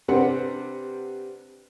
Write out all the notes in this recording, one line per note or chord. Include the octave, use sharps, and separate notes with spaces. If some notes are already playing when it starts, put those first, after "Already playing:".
C3 G3 C4 D4 B4 F#5